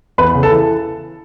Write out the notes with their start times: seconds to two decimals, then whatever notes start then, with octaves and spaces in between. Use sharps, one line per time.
0.18 E2 B4 B5
0.35 C#3
0.43 A4 A5
0.52 E3